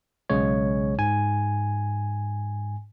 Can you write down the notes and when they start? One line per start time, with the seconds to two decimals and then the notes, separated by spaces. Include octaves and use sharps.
0.30 B1 C#3 G#3 C#5
0.98 G#2 G#5